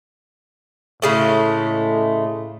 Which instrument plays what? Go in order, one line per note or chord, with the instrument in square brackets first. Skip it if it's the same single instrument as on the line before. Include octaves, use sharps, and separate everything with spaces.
[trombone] A2 [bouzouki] C#3 G#3 A3